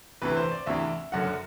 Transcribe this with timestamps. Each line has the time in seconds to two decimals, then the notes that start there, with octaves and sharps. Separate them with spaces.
0.22 D2 C3 E3 B4
0.37 C5
0.51 D5
0.66 D2 C3 E3 E5
1.12 F#1 F#2 D3 F#5